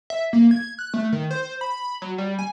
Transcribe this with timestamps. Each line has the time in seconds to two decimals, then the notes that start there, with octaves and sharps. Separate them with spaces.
0.10 E5
0.33 A#3
0.51 G#6
0.79 F#6
0.94 A3
1.12 D#3
1.31 C5
1.61 B5
2.02 F#3
2.18 G3
2.39 G#5